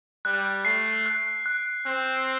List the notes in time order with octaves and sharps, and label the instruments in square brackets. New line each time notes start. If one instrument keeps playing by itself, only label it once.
[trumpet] G3 [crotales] F#6
[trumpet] A3 [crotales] C7
[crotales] F#6
F#6
[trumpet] C4 [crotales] F#6